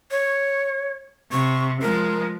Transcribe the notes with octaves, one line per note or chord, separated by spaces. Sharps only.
C#5
C3 C#6
F3 G#3 A#4